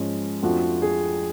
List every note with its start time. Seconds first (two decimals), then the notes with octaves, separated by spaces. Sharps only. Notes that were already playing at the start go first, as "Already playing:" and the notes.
Already playing: G#2 F3 G#3 C#4
0.42 F2 F3 A3 D4 F4 F#4
0.82 G#4